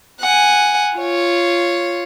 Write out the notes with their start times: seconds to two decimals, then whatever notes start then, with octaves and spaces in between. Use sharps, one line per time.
0.21 F#5 G#5
0.97 F4 C#5